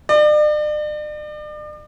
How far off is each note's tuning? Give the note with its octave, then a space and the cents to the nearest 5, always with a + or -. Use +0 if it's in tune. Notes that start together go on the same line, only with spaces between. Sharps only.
D5 +40